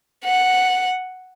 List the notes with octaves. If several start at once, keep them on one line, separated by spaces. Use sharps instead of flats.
F#5